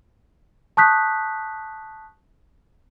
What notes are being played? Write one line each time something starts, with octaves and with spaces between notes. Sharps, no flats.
A5 C#6 D#6 F#6 G6 B6